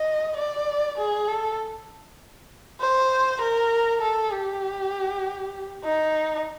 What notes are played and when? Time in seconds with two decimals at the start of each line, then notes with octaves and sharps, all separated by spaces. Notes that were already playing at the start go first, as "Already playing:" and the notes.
Already playing: D#5
0.37 D5
0.98 G#4
1.28 A4
2.81 C5
3.41 A#4
4.01 A4
4.32 G4
5.84 D#4